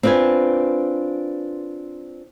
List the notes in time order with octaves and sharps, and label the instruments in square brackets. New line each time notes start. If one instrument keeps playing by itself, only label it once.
[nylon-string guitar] C4 D4 F4 B4 G#5